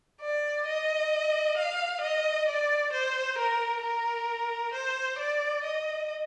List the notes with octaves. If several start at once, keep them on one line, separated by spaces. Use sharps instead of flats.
D5
D#5
F5
D#5
D5
C5
A#4
A#4
C5
D5
D#5